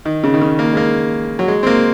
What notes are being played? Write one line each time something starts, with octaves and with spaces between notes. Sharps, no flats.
D#3
C#3
D#3
C#3
A#3
G#3
A#3
F#3
G#3
C4
A#3